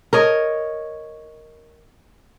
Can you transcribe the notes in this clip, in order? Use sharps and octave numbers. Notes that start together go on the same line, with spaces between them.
A#4 C#5 D#5